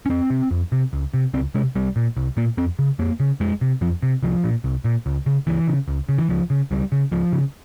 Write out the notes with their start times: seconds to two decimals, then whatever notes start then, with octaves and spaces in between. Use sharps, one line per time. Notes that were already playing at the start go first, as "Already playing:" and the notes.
0.06 C#4
0.09 F2 C4
0.30 C3
0.51 F2
0.72 C3
0.93 C#2
1.14 C3
1.34 C#2 C4
1.54 C3 G#3
1.76 C2 G3
1.96 A#2
2.17 C2
2.37 A#2 A#3
2.57 F2 C4
2.79 C#3
2.99 F2 A#3
3.20 C#3
3.40 F2 G#3
3.61 C3
3.81 F2 F3
4.03 C3
4.23 C2 F3
4.44 A#2
4.64 C2
4.84 A#2
5.06 C#2
5.26 C#3
5.47 C#2 E3
5.67 C#3
5.88 C#2
6.09 C#3
6.18 E3
6.29 C#2 F3
6.50 C#3
6.71 C#2 G3
6.92 C#3
7.11 C#2 F3
7.32 C#3